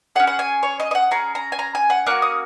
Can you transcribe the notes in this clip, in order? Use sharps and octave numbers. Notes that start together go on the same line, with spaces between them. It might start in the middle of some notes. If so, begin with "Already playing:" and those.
C#4 G#4 F#5
F#5
G#5
C#5
D#5
D#5
F#5
C#4 G#4 A#5
A#5
G#5
A#5
G#5
F#5
A#3 C#4 F#4 F#6
D#6